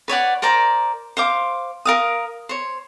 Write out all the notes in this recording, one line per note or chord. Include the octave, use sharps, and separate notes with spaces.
B4 C#5 D5 F#5
A#4 C5 D5 A#5
C5 F5 D6
A#4 F5 D#6
C5 C#5